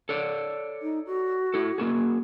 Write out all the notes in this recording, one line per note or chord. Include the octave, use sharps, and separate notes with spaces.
A4 C#5 D5
D#4
F#4
E4 A4
A#3 F#4 G#4